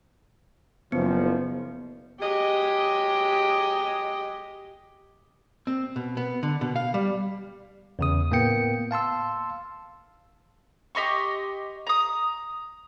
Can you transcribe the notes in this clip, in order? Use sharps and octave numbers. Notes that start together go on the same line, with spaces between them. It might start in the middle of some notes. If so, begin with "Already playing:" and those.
F#1 F3 B3
F#3 G#3 G4 D#5
C4
B2
B3
D3
B2
F5
G3
E2 C#3 D#6
A2 A#3 B3 G5 C#7
F5 A5 C6 E6
G4 D#5 C6 C#6
A#5 D#6